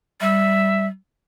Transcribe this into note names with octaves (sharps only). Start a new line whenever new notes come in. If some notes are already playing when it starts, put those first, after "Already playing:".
G3 E5